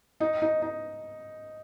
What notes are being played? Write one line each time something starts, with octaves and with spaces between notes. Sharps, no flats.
D#4
D#4
D#4